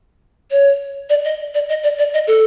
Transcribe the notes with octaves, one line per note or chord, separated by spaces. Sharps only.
C#5
D5
D#5
D5
D#5
D5
D5
D#5
A4